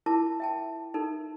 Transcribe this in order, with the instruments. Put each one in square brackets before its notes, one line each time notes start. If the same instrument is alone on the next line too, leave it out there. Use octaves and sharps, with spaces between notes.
[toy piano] E4 F4 A#4 A5 D6
E5 G5 A5
D#4 A4 A#4